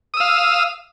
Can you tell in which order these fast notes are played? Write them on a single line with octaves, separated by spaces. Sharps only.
D#6 E6 F5